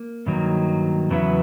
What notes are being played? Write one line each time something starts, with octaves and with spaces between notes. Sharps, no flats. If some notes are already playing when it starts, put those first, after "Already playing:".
Already playing: A#3
G2 D#3 F#3 A#3
E2 C#3 F#3 B3 E4